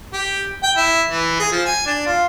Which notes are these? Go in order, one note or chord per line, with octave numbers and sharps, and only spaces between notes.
G4
G5
E4
E3
G#4
F3
G#5
D4
F4